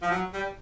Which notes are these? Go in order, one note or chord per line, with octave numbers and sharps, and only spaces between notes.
F3
F#3
G3